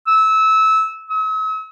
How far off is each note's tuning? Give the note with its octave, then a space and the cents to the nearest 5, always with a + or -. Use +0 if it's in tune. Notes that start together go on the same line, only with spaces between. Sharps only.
E6 -20
E6 -45